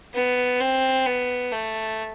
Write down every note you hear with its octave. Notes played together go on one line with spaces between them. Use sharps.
B3
C4
B3
A3